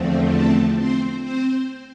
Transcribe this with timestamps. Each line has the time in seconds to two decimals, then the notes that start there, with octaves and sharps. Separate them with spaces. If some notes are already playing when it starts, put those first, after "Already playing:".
Already playing: E2 D3 F3 A3 C4
0.32 A4
0.77 C4 C5
1.23 C4 C5